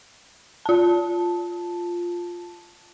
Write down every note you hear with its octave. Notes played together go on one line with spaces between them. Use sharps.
F4 A5